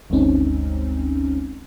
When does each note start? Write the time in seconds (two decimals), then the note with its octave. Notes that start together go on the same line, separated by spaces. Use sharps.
0.10 G1 D2 G#3 C4 C#4 D#4